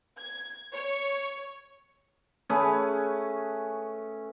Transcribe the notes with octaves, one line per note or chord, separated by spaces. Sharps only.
G#6
C#5
A3 C#4 G#4 B4